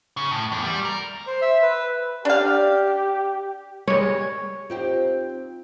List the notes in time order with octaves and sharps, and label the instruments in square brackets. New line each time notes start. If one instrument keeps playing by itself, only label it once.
[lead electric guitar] C#3
A2
E2
G3
A#4
[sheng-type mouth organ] C5
E5
B4
[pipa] D4 F5 [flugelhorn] G4
[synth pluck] G3 G#3 [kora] C#5
[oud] C4 D#4 G4 [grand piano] F4